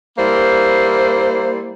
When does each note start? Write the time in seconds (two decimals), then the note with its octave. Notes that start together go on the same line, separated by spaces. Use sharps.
0.18 G3 A#3 E4 C5